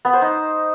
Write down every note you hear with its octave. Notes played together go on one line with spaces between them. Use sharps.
B3
C5
D#4